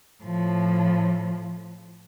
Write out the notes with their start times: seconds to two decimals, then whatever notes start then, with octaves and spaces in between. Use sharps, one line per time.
0.23 A2 F3